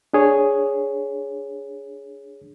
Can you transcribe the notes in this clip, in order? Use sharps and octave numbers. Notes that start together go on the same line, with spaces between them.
D4 G#4 C#5